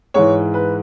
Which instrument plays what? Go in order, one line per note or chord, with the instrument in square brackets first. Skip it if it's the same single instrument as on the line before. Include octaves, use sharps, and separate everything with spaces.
[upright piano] G#2 E3 C#5
B4